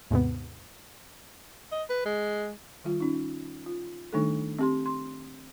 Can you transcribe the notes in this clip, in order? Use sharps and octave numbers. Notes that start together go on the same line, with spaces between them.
D#2 G#2 C3 B3
D#5
B4
G#3
D#3 G3 F4
C#4 D#4
F4
D#3 G3 A3 D4 D#4 A4
C4 G4 C6
C6